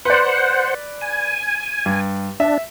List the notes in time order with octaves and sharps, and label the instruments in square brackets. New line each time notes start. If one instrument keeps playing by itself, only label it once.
[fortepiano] B4 D5 [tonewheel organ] C5 F#5
[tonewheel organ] G#5
[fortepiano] G2
[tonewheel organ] D4 [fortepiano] E5